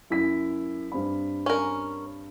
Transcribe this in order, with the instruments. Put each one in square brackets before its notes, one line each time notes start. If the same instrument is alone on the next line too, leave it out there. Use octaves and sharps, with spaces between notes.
[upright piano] F#2 E4 B6
G2 C4 B5
[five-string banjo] C#4 A#4